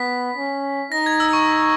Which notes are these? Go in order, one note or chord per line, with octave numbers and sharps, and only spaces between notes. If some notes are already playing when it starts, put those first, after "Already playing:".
Already playing: B3 B6
C#4
D#4 A#6
G#6
E6
C#6